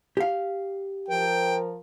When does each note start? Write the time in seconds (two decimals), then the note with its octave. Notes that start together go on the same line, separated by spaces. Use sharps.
0.17 G4 F5
1.08 F3 A#4 G5